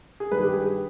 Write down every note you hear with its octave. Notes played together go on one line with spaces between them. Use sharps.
G#4
G2 D#3 G3 B4
G4
G#4